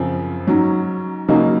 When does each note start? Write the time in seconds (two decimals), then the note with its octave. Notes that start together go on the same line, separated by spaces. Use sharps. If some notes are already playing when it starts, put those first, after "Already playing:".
Already playing: F#2 C#3 F3 C4
0.47 G#2 F#3 C#4
1.28 C#2 C#3 F#3 A#3 D#4